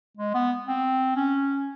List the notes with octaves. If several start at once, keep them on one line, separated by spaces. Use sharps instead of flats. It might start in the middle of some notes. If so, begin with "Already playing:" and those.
G#3
B3
C4
C#4